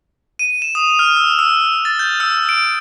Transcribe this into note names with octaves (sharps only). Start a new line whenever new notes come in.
D#7
E7
D#6
F6
E6
E6
A6
G6
E6
D7